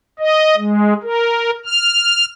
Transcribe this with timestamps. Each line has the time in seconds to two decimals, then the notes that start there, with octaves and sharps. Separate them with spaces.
0.19 D#5
0.57 G#3
1.03 A#4
1.65 F6